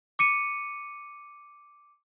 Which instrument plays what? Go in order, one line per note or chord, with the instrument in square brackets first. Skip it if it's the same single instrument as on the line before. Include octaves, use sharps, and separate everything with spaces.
[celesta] D6 C#7 D#7